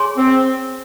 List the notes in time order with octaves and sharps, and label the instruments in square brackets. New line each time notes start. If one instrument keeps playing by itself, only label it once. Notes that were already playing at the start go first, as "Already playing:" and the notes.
Already playing: [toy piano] G#4 C#5 G#5 C6
[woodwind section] C4